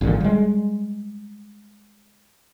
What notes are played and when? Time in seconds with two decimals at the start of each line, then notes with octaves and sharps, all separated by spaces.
0.01 G#1 A#2 D3 D#3
0.20 G3 G#3